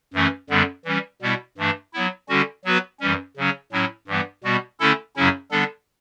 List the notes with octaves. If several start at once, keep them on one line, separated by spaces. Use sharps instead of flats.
F#2 E3 A3 C#4
F#2 D3 G3 B3
E3 G3 C#4
B2 G3 B3 E4
G2 E3 A3 D4
F#3 B3 E4
D3 G3 C#4 F#4
F#3 B3 F#4 B4
F#2 E3 G3 C#4
C#3 F#3 C#4
A2 F#3 C#4 E4
G2 E3 G3 B3
B2 G3 B3 F#4
D3 A3 C#4 E4 A4
F#2 C#3 F#3 C#4 E4
D3 G3 B3 D4 A4